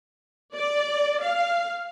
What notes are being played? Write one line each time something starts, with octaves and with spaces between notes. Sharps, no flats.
D5
F5